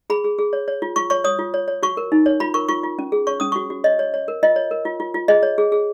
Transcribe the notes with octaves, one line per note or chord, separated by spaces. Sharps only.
G#4 B5
G#4
G#4
C#5
C#5
F4
F4 C#6
C#5 C#6
C#5 D#6
F4
C#5
C#5
F#4 C#6
A#4
D#4
C#5
F4 B5
A#4 C#6
F4 C#6
F4
C#4
G#4
C#5 C#6
C#4 D#6
F#4 C#6
F#4
C#5 D#5
C#5
C#5
A#4
F4 D#5
C#5
A#4
F4
F4
F4
G#4 D#5
C#5
G#4
G#4